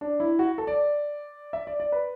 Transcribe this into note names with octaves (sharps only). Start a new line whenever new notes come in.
D4
E4
F#4
A4
D5
E5
D5
D5
B4